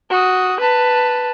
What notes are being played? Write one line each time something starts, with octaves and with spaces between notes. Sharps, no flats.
F#4 D#6
B4 A5